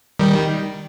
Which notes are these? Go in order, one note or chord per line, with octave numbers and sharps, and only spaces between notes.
D#3 G3